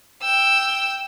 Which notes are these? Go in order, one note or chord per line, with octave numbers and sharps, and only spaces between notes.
G5 E6